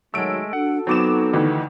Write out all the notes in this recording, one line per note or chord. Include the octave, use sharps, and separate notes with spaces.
D#3 F#3 G#3 A3 E6 D7
D4 F#4 A4 F#5
F#3 B3 C4 D#4 D6 E7
D2 D#3 E3